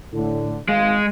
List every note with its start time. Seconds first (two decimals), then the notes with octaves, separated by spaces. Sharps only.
0.13 A2 D3
0.69 G#1 G#3 F5